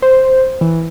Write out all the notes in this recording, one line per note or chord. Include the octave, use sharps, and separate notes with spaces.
C5
E3